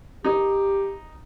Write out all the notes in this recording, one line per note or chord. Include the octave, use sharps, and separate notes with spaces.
D#4 G4